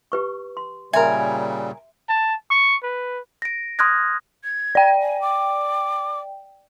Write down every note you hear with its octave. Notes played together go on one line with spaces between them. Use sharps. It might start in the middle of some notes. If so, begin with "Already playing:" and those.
G4 B4 C#6
C6
A#2 C#3 G3 A#4 E5 G#5 C6
A5
C#6
B4
A#6 D7
C6 D#6 F6 F#6 G#6 A#6
G#6
D5 G5
G#5
D6